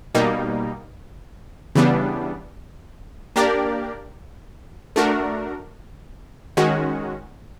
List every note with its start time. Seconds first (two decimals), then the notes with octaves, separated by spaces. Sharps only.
0.15 B2 G3 A#3 D#4
1.75 C#3 E3 G3 B3 D4
3.36 A#3 D4 G4 A#4 D5
4.96 A3 D4 F#4 A#4
6.57 D#3 G#3 C#4 F#4